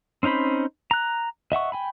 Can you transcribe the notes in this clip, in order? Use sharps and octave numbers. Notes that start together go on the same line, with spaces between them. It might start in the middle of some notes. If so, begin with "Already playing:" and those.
C4 C#4 D#4 C5 B5
A#5 F#6
D#5 E5 F#5 C#6
G5 G#5 B5